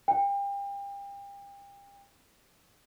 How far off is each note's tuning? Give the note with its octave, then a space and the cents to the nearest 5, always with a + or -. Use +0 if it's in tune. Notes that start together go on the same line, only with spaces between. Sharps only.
G5 +35